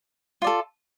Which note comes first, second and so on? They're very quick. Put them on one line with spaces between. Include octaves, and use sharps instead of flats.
F4 D5 A4